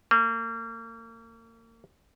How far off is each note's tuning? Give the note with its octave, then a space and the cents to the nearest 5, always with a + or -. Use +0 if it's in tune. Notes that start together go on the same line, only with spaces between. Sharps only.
A#3 -35